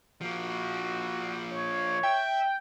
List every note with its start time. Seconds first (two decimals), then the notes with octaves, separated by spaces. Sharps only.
0.21 F3 A#3 F#4
1.51 C#5
2.03 E5 G5